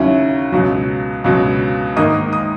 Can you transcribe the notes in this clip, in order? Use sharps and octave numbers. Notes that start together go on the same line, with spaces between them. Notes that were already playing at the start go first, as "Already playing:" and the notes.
Already playing: D#2 C#3 F#3 C#4 E4
C#2 B2 F#3
C#2 B2 F#3
G#2 D#3 A#3 D#4 D#6
D#6